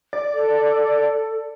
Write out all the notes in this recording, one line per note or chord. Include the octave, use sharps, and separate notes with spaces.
D5
A4